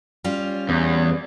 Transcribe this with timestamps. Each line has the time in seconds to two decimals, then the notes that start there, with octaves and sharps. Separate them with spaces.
0.24 G3 C#4 F4
0.69 E2